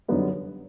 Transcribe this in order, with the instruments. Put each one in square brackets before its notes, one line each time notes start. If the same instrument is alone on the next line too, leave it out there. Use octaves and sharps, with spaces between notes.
[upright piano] F#2 D3 G3 B3 D#4